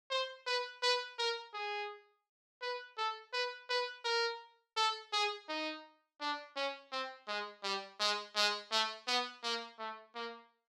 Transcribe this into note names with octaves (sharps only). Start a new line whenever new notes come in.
C5
B4
B4
A#4
G#4
B4
A4
B4
B4
A#4
A4
G#4
D#4
D4
C#4
C4
G#3
G3
G#3
G#3
A3
B3
A#3
A3
A#3